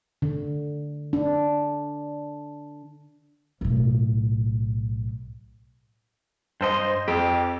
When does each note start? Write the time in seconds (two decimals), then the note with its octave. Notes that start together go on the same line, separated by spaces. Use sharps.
0.22 D3
1.13 D4
3.61 B1 A2
6.61 G2 A4 C5 D#5 C6
7.08 F2 G4